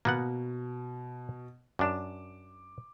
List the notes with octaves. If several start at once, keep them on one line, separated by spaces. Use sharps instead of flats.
B2 A#3 B3 F#5
F#2 D4 D6 E7